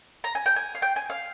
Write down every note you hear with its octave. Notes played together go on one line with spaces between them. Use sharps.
A#5
G#5
G5
G#5
F5
G5
G#5
F5